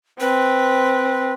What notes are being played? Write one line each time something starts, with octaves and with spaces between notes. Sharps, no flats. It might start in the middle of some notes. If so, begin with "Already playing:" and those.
C4 B4